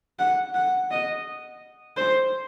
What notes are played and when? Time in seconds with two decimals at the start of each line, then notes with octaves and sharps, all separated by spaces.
0.19 F#5
0.54 F#5
0.91 D#5
1.97 C5